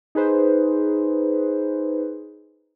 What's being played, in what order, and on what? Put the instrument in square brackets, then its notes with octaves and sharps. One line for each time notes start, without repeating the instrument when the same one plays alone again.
[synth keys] D#4 G#4 B4 C5